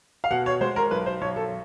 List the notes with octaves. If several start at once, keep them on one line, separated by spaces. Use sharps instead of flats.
F5
B2 F#5
C#5
G#3 C5
A#4
B1 B4
C5
B1 C#5
A4